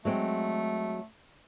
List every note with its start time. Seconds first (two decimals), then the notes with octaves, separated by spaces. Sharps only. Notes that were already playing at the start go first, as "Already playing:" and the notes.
0.05 F#3 G#3 A3 C4